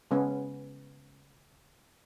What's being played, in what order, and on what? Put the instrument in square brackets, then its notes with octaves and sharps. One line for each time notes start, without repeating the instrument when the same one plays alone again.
[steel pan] C#3 G#3 B3 C#4